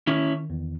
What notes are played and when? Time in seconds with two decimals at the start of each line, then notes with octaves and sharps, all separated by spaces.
0.07 D#3 C#4 E4
0.50 E2